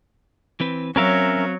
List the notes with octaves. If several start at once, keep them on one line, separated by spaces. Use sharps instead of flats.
E3 C4 B4
F#3 C4 C#4 F#4 A#4 E5 F5